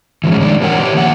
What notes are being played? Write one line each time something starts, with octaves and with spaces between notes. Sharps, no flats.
E3 F3 G#3 C#4
D#3 G3 G#3 D4
E3 D4 A#4 C#5 F#5 G5
G4 B4 C#5
D#3 F3 A#3 E5 F#5